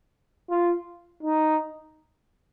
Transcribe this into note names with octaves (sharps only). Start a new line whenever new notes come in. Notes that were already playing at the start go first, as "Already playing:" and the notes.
F4
D#4